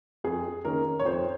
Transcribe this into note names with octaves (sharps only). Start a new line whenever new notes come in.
F2 G#4
D#3 A#3 C#4 A#4
C#5
F2 C5